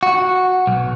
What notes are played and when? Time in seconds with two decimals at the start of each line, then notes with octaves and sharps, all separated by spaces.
0.03 F#4
0.67 B1